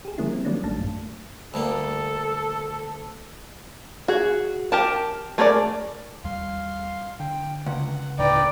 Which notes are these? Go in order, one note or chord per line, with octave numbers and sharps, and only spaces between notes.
G4 G#4
D3 F3 G3 A#3 C#4 E4
C4
D#3 F#3 G3 A#3 C#4 D4
A1 A3 D4 A5
F#2 A2
D2 G3 A#3 A4
F#4 G#4
G4 A#4 A5
A3 G#4 A#4 B4 D5
D#2 G3 F5 C6
D3 G5
C#2 F#5
D2 A2 D3 B4 D5 G5 A#5